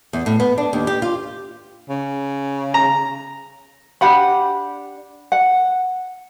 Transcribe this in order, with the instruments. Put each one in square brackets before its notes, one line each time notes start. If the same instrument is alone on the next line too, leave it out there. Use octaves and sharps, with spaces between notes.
[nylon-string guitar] E2
A2
B3
D4
D#2
G4
F4
[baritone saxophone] C#3
[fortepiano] A#5
[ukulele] D4 G4 F#5 B5
F#5